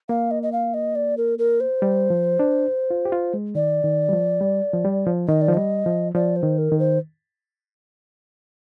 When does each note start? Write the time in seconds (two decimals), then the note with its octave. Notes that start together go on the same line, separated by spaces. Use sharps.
0.09 A#3 F5
0.31 D#5
0.43 D#5
0.52 F5
0.74 D#5
0.95 D5
1.17 A#4
1.39 A#4
1.60 C5
1.82 G3
2.10 F3
2.39 D4
2.90 F4
3.05 G4
3.12 F4
3.34 G#3
3.55 D#3 D5
3.84 D#3
4.09 G3
4.13 F3
4.41 G3
4.73 F3
4.85 G3
5.07 F3
5.28 D#3 D#5
5.41 D5
5.48 F3
5.54 G3 D#5
5.86 F3
6.14 F3 D5
6.36 C5
6.43 D#3
6.58 A#4
6.72 D#3
6.79 C5